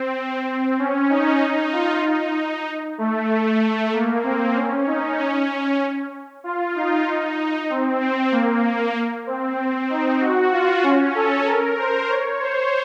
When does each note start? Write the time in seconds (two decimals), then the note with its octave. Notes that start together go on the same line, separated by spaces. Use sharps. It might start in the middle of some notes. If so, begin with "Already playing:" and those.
Already playing: C4
0.79 C#4
1.10 D#4
1.73 F4
2.04 D#4
2.98 A3
3.61 A3
3.93 A#3
4.24 C4
4.55 C#4
4.87 D#4
5.18 C#4
6.44 F4
6.75 D#4
7.70 C4
8.01 C4
8.32 A#3
9.27 C4
9.90 D#4
10.21 F#4
10.52 F4
10.83 C#4
11.15 A4
11.47 A#4
11.78 C5
12.09 C#5
12.40 C5